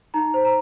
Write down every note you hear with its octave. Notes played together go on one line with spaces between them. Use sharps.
D#4 A#5
C5
A#5